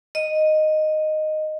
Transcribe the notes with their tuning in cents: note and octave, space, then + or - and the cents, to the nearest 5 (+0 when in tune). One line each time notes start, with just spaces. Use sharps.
D#5 -5